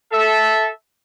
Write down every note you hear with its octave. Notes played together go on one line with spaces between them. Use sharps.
A4 E5